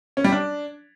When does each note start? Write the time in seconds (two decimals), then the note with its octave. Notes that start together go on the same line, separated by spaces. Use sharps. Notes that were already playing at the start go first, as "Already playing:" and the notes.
0.17 C#4
0.24 G3
0.32 D4